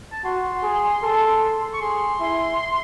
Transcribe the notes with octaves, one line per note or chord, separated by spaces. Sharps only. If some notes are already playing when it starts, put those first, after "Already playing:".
A5
F#4 C6
G#4
A4
C#6
G#4 C6
E4